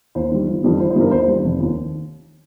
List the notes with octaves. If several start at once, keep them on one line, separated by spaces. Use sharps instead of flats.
D#2 C5
D#3 G3
G1
F2 D#3 G3
G1 C5
C5
G2 D#3 G3 A#4
D#2 C5
C5
D#3 G3
F1
D#2 D#3